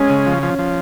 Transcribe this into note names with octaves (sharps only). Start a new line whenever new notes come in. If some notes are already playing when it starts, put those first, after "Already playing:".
Already playing: G#3 C#4
C#3
F3
F3
F3